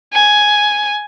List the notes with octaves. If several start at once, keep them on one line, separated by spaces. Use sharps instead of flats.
G#5